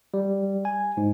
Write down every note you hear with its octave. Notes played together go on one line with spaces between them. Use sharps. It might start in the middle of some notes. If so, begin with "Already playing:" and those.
G3
G#5
G#2